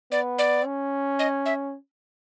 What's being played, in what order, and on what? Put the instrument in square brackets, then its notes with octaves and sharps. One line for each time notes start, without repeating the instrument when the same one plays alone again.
[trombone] B3 [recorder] D5
[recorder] D5
[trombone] C#4
[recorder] D#5
E5